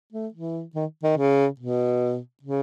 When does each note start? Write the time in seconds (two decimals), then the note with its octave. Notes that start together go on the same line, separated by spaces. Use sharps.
0.13 A3
0.34 E3
0.75 D#3
1.03 D#3
1.18 C#3
1.60 B2
2.43 C#3